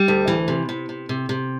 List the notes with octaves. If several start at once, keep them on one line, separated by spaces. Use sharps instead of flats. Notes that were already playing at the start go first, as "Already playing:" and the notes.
Already playing: G3
D2
E3
C3
C3
C3
C3
C3